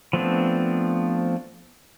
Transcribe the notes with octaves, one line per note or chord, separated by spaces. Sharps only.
F3 A3 B3 C4 D4